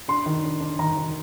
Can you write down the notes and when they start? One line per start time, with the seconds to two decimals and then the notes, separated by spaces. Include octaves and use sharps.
0.08 D4 C6
0.26 D#3
0.43 D4
0.61 D4
0.79 D#3 A#5
0.97 D#3